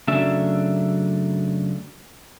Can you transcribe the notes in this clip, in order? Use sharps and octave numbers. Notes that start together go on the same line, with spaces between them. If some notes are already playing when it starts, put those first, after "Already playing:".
F#2 C#3 F#3 A3 D4 E5